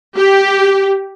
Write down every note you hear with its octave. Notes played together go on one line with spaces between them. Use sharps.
G4